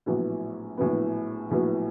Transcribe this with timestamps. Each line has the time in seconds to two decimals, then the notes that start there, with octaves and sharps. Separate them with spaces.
0.06 A#1 A2 F#3 B3
0.78 A#1 A2 F#3 B3
1.51 A#1 A2 F#3 B3